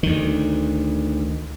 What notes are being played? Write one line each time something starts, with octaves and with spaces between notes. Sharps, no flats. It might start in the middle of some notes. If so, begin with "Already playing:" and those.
D2 D#3